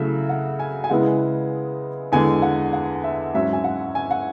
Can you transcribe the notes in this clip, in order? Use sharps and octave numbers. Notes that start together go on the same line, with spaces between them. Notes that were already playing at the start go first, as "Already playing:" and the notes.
Already playing: C#3 F#3 A3 E4 E5
F#5
G#5
G#5
C#3 G#3 B3 E4 F#5
E2 D3 G#3 G#5
F#5
F#5
E5
G#2 F#3 C#4 E5
G#5
F#5
G#5
F#5